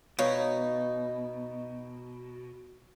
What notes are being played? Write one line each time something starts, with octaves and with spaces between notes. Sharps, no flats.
B2 D#4 B4 C#5 F5